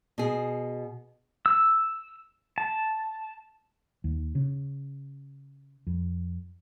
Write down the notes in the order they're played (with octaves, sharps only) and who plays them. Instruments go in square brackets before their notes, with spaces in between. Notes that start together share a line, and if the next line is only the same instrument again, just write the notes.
[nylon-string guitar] B2 G#4
[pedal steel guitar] E6
A5
[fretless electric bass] D#2
C#3
F2